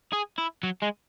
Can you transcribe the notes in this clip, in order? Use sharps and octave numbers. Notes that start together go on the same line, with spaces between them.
G#4
E4
F#3
G#3